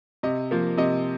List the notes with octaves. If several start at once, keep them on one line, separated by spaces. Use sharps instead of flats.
C3 D#5
F3 A#3
C3 D#5